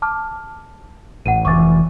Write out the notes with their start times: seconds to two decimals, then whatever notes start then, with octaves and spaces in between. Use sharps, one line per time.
0.02 A5 D6 F6
1.26 A1 F#5 D#7
1.45 F1 E3 C#6 D6 A6